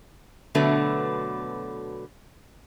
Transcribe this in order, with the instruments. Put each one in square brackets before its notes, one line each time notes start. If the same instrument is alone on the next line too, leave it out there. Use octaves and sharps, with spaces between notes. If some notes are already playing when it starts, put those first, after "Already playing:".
[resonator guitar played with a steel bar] B2 D3 F#3 A3 B3